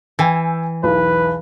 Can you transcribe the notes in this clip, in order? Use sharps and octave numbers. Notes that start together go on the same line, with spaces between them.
E3 G5 G#5 E6
B1 E2 B4